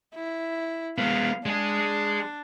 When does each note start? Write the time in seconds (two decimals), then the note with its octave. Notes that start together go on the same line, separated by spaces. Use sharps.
0.15 E4
0.98 G#3 B3 F5
1.46 G#3 D4 G#4